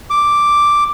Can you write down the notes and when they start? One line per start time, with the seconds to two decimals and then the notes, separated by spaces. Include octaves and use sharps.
0.10 D6